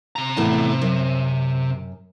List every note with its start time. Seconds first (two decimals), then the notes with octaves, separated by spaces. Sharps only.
0.16 C3 A#5
0.37 E2 A2 A5
0.82 F#2